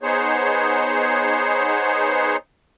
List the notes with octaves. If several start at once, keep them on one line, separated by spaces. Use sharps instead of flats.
B3 D#4 G#4 C5 C#5